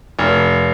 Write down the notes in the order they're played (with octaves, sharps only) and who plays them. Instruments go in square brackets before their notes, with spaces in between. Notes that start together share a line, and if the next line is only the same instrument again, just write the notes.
[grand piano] F1